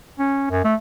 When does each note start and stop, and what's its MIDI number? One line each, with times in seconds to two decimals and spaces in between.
0.19 0.48 61
0.51 0.64 42
0.64 0.75 57